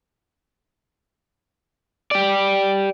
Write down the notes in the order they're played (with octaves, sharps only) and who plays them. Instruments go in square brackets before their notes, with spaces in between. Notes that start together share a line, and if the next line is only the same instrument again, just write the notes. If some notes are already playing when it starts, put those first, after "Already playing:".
[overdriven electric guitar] G4 D5